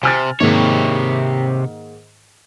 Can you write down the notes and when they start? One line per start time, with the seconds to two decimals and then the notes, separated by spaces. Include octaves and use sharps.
0.03 C3 G#5 F6 A6
0.40 G#2 C3 D#3 A#3 C#5